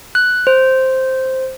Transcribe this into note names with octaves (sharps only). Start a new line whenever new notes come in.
F#6
C5